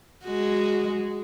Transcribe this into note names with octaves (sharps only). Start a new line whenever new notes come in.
G#3 F#4